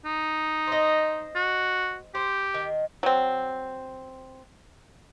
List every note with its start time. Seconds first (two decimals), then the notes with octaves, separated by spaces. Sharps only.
0.05 D#4
0.67 C5 D#5
1.36 F#4
2.15 G4 C5
2.54 D#3
3.03 F#3 C4